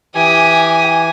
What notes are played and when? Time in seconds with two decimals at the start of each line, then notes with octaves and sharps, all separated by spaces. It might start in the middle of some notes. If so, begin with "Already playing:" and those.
0.15 E3 G4 G#5 D#6